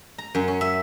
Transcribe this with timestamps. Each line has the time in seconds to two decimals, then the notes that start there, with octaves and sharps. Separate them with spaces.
0.18 A#5
0.35 F#2
0.48 C#4
0.61 E5